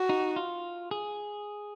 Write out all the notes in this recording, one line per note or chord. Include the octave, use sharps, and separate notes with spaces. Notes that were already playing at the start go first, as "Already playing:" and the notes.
Already playing: F#4
D#4
F4
G#4